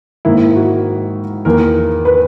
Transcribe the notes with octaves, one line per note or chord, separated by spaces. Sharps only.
G#2 D#3 A#3 E4
F#4
E2 D#3 A#3 A#4
B4